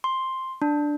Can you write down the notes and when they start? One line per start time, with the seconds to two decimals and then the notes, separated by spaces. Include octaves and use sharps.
0.04 C6
0.62 D4